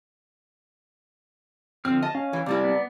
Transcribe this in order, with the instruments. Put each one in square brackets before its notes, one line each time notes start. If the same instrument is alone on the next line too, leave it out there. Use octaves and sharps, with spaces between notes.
[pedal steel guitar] D3 F3 F6 [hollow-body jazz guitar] C4
[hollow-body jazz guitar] D#5 [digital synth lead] A5
[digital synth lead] C#4 [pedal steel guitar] F5
[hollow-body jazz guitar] E3
[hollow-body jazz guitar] C3 G3 E4 [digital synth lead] D5
[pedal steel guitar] B3